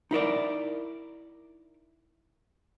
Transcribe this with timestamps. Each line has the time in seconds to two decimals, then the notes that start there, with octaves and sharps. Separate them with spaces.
0.11 D#4 E4 A#4 D5